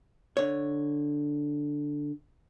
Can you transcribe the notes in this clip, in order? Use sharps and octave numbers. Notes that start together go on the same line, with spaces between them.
D3 C#5